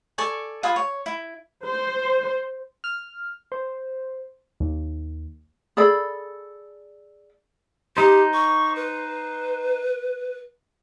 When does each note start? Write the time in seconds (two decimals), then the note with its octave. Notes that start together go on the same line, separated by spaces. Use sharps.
0.18 A4 D5 G#5 C#6
0.63 F4 B4 G#5 D#6
0.76 C#5
1.06 E4
1.64 C5
2.84 F6
3.52 C5
4.60 D#2
5.77 G#4 A4 D5 B5
7.97 D#4 G4 C5
8.34 C#6
8.76 B4